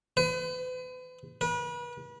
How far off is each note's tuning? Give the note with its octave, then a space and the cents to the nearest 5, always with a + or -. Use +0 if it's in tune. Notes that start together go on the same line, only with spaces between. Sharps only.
B4 +40
B4 -35